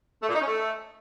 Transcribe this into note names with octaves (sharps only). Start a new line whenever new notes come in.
A3
A#2
D#4
C#4
A3